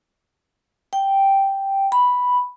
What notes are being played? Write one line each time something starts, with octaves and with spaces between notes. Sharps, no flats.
G5
B5